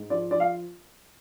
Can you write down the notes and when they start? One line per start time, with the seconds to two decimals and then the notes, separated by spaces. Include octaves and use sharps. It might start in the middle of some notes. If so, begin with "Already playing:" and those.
Already playing: G#2
0.10 F3 D5
0.31 F3 D5
0.40 F5